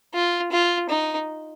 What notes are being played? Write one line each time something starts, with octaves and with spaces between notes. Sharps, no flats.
F4
F4
D#4